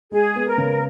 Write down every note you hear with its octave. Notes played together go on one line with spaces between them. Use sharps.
G#3 G#4
B3
A#4
C#3